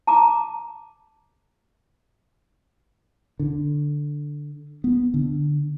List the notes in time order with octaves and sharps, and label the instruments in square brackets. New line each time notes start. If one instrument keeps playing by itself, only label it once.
[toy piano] A5 A#5 D6
[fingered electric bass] D3
B3
D3